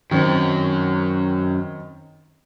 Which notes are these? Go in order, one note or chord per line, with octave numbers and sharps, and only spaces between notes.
F#2 D#3 C4